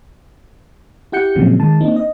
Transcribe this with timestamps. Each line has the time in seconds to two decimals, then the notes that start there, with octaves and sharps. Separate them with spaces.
1.12 E4 G4 F#5 G6 C#7
1.36 A#2 C#3 F3 F#3 G#3 C4
1.60 D#3 G#3 A5
1.81 A#3 C4 D4 D#4
1.96 D#5